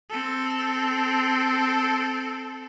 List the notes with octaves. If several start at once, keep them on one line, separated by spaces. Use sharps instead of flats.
C4 A4